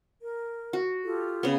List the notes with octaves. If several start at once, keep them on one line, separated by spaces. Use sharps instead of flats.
A#4
F#4
F4 G4 A4
C#3 B3